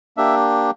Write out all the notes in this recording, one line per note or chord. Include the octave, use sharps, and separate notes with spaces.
A#3 D4 G4 E5